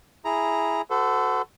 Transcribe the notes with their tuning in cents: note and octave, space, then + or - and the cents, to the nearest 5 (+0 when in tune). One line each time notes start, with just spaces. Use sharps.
E4 +0 G#4 +0 A#5 +0
F#4 +5 A4 +0 C5 -45